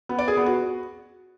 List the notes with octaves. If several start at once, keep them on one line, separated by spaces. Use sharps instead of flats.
B3
D5
G#4
B3
F#4